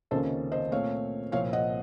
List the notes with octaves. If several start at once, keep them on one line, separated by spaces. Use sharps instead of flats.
C#2 C3 D#3 A#3 C#4 A4 C5
C5 D#5
A#2 A3 C4 C#5 F5
C2 A#2 F3 C4 C#5 F5
D#5 F#5